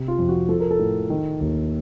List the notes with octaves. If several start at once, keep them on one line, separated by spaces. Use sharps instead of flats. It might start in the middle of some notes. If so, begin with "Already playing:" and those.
Already playing: C3
F4
F2
F#4
F3 A4
A#4
A4
A2
D#3
D#2